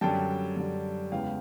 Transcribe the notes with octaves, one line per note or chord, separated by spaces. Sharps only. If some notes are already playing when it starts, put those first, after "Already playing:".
F#2 D3 G3 G5 A5
F#2 D3 G3
E2 C#3 E3 G#3 F5 G5